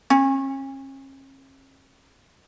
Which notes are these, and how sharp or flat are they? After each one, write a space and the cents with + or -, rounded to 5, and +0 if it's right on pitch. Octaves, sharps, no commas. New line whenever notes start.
C#4 -40